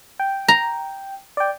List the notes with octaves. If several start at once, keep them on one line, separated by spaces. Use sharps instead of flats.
G5
A#5
D5 G5